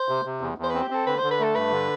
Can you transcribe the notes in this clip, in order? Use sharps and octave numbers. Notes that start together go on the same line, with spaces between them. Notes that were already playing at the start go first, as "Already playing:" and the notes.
Already playing: C5
C3
C3
E2
E2
C5
B4
C4
G4
C4 A4
D3 B4
C5
D3
B4
A3 A4
G2 B4
D3